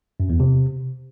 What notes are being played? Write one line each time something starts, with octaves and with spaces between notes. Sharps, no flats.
F#2
E2
C3